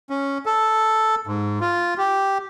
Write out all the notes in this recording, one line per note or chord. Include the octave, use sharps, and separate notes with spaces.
C#4
A4
G#2
F4
G4